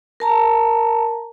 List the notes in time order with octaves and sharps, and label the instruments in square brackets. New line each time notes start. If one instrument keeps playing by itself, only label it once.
[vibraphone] A#4 A5 A#5